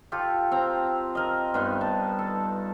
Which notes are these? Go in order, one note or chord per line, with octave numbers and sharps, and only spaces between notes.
F4 G4 A4
C4 A#5
A#4 D#5
G2 B3 D#4
A5
A4